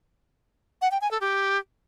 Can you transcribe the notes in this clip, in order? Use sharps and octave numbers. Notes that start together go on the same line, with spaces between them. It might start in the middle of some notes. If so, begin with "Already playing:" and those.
F#5
G5
G#5
A4
G4